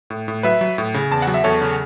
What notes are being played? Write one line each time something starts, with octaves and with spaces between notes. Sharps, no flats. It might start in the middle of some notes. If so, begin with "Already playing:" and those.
A2
A2
F#3 B4 E5
F#3
A2
C#3
E2 A5
F#3 F#5
E5
E2 A4 C#5
C#3